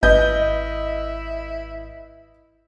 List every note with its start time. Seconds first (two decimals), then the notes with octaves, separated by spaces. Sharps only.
0.03 G#1 E4 B4 D#5 G6